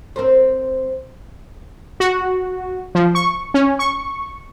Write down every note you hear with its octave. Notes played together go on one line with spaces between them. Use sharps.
C4 A#4 C5
F#4
F3
C#6
C#4
C#6